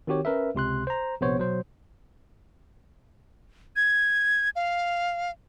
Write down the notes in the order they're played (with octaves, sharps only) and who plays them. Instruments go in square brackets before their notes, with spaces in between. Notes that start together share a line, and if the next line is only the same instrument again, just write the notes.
[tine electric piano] D#3 C4 F#4 G4 C#5
C#4 A#4 B4 E5
C#2 C3 C6 F#6
C5 A#5
A#1 C3 B3 C5 C#5
B2 F#3 C5
[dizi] G#6
F5